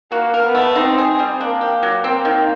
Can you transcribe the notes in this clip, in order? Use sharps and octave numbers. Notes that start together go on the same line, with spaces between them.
A#3 F#4
A#4
B3
A3
C4 D#4
G#4
G3
A#3 D4
G4
F#3
A#3 C4
D#3